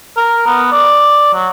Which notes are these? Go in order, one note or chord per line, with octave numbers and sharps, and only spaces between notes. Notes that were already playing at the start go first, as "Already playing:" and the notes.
A#4
B3
D5
F#3